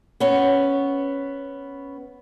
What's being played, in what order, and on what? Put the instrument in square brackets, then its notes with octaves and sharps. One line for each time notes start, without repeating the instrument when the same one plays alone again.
[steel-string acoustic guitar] B3 C#4